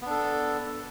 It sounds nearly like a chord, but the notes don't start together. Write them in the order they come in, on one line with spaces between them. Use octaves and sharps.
B3 D4 A4